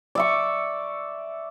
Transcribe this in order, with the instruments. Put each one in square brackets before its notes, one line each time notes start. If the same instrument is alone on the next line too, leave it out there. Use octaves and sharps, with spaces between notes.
[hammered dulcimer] D5 E5 C#6